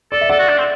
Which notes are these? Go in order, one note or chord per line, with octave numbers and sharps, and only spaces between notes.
A4 D5
E5
A4 D5 F#5
F#4
D4
C4